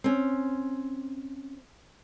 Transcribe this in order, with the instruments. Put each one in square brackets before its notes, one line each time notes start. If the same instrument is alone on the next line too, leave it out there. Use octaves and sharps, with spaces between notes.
[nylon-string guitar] C4 C#4